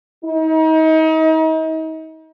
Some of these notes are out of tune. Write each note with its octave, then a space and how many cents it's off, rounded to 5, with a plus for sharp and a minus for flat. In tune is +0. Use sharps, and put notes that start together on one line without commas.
D#4 +35